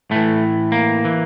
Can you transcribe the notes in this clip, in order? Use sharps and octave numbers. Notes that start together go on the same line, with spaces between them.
A2 E3 A3
A#3
E3